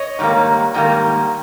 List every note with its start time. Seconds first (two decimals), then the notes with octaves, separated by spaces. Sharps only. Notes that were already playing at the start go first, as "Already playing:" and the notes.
Already playing: C#5 D#5
0.19 G#2 D#3 G3 A#3
0.74 G#2 D#3 G3 A#3